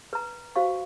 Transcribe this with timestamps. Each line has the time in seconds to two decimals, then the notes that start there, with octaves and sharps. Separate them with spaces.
0.13 B4 A#5
0.56 F#4 C5 F5 C#6